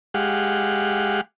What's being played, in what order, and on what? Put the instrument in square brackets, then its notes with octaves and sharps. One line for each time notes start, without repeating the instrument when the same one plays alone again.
[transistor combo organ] G#3 G4 F5 F#5